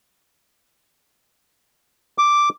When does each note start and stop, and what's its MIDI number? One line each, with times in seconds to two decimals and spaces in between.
2.18 2.49 86